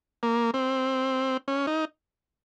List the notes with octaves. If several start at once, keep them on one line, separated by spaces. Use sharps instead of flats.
A#3
C4
C#4
D#4